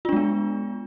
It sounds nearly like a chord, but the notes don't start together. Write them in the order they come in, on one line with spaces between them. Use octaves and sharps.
F4 D4 G#3 B3